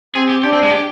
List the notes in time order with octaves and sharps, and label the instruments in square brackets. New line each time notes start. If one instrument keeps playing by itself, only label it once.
[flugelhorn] C4 [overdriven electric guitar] G#4
[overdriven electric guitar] G4
[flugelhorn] D4 [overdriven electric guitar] G4
[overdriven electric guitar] C4
G#3
G4